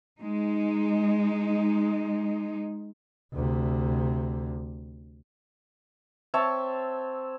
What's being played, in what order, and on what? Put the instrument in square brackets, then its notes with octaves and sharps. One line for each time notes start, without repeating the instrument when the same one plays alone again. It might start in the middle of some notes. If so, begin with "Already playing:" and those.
[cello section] G#3 D#4
[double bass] D2 C3
[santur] C4 C#5 E5 A5